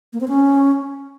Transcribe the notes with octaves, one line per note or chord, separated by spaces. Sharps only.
A#3
C4
C#4